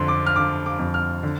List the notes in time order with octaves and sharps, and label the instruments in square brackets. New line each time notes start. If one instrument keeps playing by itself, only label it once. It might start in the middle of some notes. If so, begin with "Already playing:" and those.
Already playing: [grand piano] F2 D3 C6
D6
F6
D3 D6
D6
F2
F6
D3